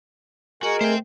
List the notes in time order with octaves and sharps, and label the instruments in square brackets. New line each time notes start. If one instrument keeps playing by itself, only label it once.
[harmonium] G#3 A#4 G#5 [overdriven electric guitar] F#4
[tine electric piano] A3 [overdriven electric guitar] C5 G5